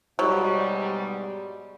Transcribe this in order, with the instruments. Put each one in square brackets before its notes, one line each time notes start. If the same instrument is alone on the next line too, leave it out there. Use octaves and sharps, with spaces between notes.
[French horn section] G#2 B2 G3 [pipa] F#3